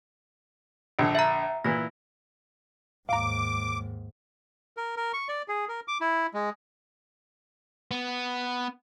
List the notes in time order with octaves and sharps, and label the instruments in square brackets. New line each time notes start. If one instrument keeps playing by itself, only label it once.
[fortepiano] A#1 D3
[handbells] E5 A#5
[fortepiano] A#2 E3 E4 [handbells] A#6
[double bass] D#2 G#2 [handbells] F5 A#5 [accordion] D6
[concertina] A#4
A#4
C#6
D5
G#4
A#4
D6
E4
G#3
[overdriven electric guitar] B3